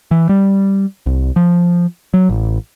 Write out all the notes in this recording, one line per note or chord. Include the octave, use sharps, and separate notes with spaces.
E3
G3
C2
F3
F#3
A1